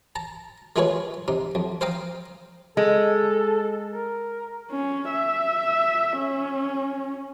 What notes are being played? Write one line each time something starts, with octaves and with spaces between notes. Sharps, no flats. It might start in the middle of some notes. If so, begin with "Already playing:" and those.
A5 A#5
G#3 A3 F4 G#4 B4 C#5
C3 D#4
F2
C5 F5 G5 A#5 D#6
G#3 A4
A#4
C#4
E5
C#4